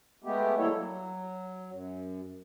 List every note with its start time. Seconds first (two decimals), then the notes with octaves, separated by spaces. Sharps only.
0.24 G#3 A3 B3 G4
0.58 E3 G3 A#3 E4 A4 C#5
0.75 F#3
1.72 F#2